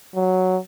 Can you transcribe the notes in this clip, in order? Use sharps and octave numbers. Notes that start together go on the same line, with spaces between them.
F#3